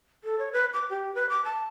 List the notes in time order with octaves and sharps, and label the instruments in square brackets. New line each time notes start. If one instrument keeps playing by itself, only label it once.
[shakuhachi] A4
C#5
B4
D6
G4
B4
D6
A5